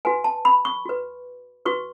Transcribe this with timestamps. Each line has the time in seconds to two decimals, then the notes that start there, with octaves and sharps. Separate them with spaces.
0.05 F#4 B4 G#5
0.24 A5
0.45 B5
0.65 C#6
0.85 F#4 B4
1.65 F#4 B4 C#6